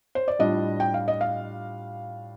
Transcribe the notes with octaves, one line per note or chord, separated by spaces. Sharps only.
C5
D5
A2 G3 D4 F4 D#5
G5
F5
D#5
F5